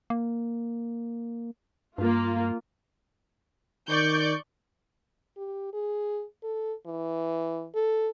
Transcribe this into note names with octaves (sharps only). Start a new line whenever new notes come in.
A#3
G2 A#3 F4
D#3 D5 C#6 G6
G4
G#4
A4
E3
A4